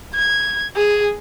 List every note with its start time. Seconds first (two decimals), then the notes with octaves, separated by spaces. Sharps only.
0.14 G#6
0.76 G#4